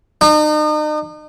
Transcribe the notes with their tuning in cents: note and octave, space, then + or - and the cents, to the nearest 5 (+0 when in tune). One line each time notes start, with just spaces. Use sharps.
D#4 -40